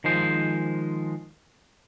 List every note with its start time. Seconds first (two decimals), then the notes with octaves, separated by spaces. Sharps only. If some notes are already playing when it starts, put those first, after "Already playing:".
0.04 D#3 F3 G#3 C5